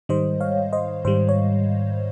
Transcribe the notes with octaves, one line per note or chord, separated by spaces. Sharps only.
G#2 D#3 G3 C5 D#5
C#5 F5
C5 D#5
G#2 D#3 G3 C5
C#5